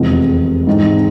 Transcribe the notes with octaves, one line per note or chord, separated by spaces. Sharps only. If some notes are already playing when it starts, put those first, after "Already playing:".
Already playing: F1 E2 C3 F3 G#3
G#2 E3 G#3 C4 D#4